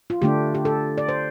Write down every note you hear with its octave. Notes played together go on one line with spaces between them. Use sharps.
F4
D3 A3 D4 G4
G4
A4
D5
C5